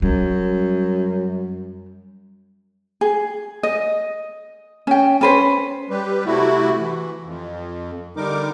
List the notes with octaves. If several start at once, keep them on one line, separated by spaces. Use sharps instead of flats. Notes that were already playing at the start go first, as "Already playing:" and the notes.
F#2 G3
G#4
D#5
C#4 G5
C#4 B4 C5
G3 G4 B4
C3 A3 E4 F#4
E3
F2
D3 G3 D#4 A#4 D6